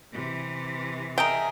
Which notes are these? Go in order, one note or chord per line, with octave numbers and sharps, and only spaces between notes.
C3 E3
G#4 A#4 D#5 E5 G5